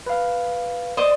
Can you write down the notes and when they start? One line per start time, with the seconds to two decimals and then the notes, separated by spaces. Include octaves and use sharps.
0.06 B4 F5
0.97 C5 D5 D#5 D6